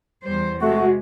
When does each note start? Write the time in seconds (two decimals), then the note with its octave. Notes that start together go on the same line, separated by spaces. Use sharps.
0.23 E2 G3 C5
0.60 C3 G#3 A3 F#4